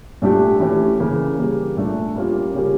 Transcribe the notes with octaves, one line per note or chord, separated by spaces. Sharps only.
A#2 A3 D4 G4
E3 A3 C#4 G4
C#3 E3 A#3
C#3 G3 A#3
A#2 A3 D4
A#2 G3 A#3 C#4 F4
C#3 G3 C#4 G4 A#4